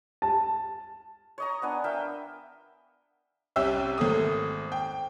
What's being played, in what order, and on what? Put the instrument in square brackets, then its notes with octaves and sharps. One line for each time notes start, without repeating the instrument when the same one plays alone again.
[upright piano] A5
[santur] C#5 D#5 A#5
B3 D4 G#5
A#4 E5 F5 G5
[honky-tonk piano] C2 C#4 G4 E5 E6
G#1 A3 A#3 D#6
G5